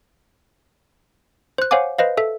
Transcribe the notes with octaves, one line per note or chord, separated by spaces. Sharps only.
C5 F#6
C5 C#5 F5 F#5 G#5 D6
B4 C5 D#5 F5
A4 E5